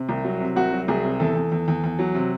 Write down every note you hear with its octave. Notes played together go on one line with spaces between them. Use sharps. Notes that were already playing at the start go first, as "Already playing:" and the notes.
Already playing: C3
C2
F#3
C3
C2 F#4
F#3
C2 G#4
C3
E2 A4
E2
E2
E2
E2
F#3
C3